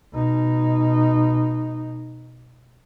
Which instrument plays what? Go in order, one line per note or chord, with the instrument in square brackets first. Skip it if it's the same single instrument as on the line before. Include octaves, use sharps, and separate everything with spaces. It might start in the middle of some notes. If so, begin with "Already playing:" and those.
[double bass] B2 D#4